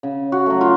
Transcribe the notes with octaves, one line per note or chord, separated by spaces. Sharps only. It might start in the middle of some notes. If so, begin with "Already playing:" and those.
C#3
F#4
F#3 A3
F4